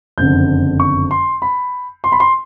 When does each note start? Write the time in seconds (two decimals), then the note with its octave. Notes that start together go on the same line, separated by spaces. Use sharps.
0.18 F#1 F2 D3 G6
0.80 C#6
1.11 C6
1.42 B5
2.04 C6
2.12 B5
2.20 C6